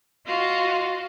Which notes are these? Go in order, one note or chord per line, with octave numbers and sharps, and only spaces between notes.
F4 F#4 D#5 F5